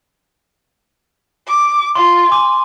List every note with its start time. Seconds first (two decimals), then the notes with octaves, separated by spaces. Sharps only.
1.47 D6
1.96 F4 C6
2.32 G#5 D6